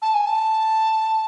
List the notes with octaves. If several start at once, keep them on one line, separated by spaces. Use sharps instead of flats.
A5
G#5
A5